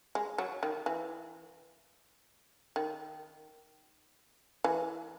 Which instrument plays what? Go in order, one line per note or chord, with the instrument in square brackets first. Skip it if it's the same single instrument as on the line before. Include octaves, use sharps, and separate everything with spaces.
[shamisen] G#3
F#3
D#3
E3
D#3
E3